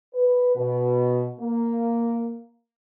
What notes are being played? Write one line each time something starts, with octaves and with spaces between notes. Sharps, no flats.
B4
B2
A#3